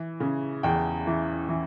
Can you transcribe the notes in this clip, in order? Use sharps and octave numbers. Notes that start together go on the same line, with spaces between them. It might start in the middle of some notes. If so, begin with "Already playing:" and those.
Already playing: E3
C#3
E2 G5
E3
E3